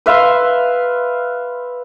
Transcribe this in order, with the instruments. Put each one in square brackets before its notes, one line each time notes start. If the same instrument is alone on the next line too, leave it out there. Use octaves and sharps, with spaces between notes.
[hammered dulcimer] B4 E5 F5 C6